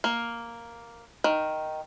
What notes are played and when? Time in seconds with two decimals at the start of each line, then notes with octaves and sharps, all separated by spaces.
0.04 A#3
1.24 D#3